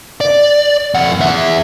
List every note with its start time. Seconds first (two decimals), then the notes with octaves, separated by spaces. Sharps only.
0.21 D5
0.94 F2 F#5
1.20 E2 E5